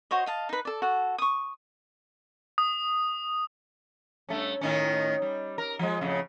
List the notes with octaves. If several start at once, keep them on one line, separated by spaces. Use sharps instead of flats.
F#4 C5 C#5 D#5
D#5 F5 A5
D#4 B4
A4 D5
F#4 A4 F#5
C#6 D#6
D#6
G2 A3 C#4
A2 D#3 C#4
G3
A#4
F3 G#3
F2 A2 C#3